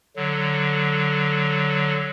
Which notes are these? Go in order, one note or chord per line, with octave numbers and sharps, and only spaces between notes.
D3 F#3